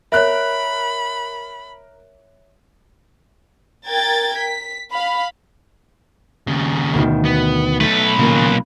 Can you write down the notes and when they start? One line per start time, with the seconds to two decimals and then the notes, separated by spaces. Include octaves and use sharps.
0.12 A#4 C#5 E5 B5 F#6
3.87 A#4 G5 G#6 A6
4.38 B6
4.91 F5 B5
6.47 D#2 C#3
6.93 D2 B2 D#3
7.25 B3
7.81 B1 A3 B4
8.19 D#2 A#2 C#3 A#3